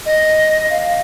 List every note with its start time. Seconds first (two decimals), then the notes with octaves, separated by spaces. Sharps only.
0.05 D#5
0.69 F5